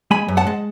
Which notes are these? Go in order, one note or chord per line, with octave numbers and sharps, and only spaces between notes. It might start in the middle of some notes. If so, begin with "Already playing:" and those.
G#3 G#5 B5
F#2
F#5 A5
G#3